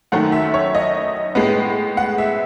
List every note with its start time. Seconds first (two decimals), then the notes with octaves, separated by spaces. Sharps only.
0.12 F#2 D#3 A3 F#5
0.32 E5
0.54 C#5
0.75 D#5
1.35 A2 G#3 B3
1.97 F#5
2.18 E5